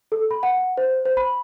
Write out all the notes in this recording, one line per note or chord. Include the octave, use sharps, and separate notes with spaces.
A4
B5
F#5
F#5
C5
C5
B5